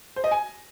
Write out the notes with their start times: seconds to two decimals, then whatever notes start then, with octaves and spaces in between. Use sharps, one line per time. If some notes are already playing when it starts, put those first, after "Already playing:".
0.16 C5
0.24 D#5
0.31 G#5